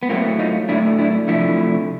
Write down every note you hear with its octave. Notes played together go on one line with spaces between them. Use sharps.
B3
A2 F#3 A3 A#3 C4
D#4 F4
A2 F#3 A3 D4 E4
D4 E4
C3 F3 A3 D4 E4